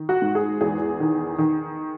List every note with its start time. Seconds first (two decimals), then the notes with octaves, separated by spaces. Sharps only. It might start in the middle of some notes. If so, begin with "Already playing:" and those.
Already playing: D#3
0.09 F#4
0.22 G#2
0.35 G#4
0.61 E2 G#4
1.00 D#3
1.38 D#3